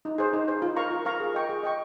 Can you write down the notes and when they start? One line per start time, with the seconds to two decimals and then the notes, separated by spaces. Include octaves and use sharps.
0.05 D#4
0.18 G#4 C5
0.33 D#4
0.48 G#4 C5
0.62 F4
0.76 A#4 F5 A#5 C#6
0.91 F4
1.05 A#4 F5 A#5 C#6
1.20 G#4
1.35 D#5 G5 C#6
1.49 G#4
1.63 D#5 G5 C#6